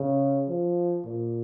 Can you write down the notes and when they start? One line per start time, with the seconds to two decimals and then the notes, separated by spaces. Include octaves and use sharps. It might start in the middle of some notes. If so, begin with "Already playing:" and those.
Already playing: C#3
0.49 F3
1.06 A#2